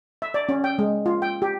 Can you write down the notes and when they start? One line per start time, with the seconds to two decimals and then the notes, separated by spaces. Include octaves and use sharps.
0.22 E5
0.34 D5
0.49 C#4
0.64 G5
0.79 G#3
1.06 F4
1.22 G5
1.42 G4